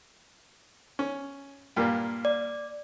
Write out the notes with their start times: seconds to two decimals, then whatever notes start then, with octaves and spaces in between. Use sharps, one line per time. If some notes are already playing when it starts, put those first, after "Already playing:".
0.99 C#4
1.76 G2 A#2 A#3
2.25 D5